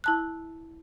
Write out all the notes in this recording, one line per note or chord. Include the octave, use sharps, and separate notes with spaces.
E4 A5 F#6